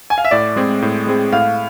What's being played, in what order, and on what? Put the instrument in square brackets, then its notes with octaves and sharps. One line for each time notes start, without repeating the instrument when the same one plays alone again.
[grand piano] G#5
F5
E5
[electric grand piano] A2 [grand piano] D5
[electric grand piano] G#3 C4 G#4
A2
G#3 C4 G#4
[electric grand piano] A2 [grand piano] F5